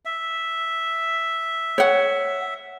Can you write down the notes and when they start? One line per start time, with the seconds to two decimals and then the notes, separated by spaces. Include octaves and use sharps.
0.05 E5
1.78 C#5 F#5